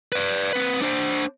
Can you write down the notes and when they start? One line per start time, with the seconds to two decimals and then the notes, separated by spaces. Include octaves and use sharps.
0.12 B4 D5
0.53 C4 B4
0.82 D4 C5